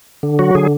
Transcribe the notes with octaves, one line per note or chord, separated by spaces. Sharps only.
D3
F#3 F#4
D3 G#4